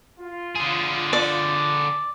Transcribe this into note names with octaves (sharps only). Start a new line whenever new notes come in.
F4
D3 G#4
D5